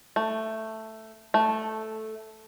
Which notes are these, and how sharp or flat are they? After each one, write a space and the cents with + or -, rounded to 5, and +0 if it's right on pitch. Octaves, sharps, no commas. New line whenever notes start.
A3 +5
A3 -5